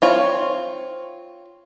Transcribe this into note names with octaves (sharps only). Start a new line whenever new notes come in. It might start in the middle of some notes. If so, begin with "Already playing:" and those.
C4 F4 C#5